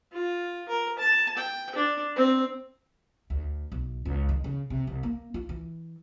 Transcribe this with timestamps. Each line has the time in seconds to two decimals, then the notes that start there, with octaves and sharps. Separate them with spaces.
0.12 F4
0.69 A#4
0.99 A5
1.37 G5
1.75 D4
2.16 C4
3.30 D2
3.72 B1
4.05 C#2
4.29 D#3
4.44 C#3
4.70 C3
4.87 C2
5.03 A#3
5.34 F4
5.49 E3